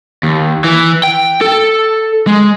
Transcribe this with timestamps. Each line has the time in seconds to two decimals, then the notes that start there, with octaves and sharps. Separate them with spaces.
0.23 D#2
0.64 E3
1.03 G5
1.41 A4
2.27 G#3